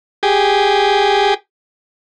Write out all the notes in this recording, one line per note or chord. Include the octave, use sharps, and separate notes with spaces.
G4 G#4